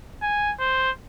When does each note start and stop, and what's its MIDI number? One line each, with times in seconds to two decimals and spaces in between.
0.22 0.53 80
0.60 0.91 72